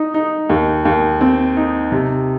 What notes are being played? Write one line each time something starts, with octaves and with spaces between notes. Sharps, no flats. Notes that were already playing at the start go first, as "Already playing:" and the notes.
Already playing: D#4
D#4
D#2
D#2
C4
D#4
C3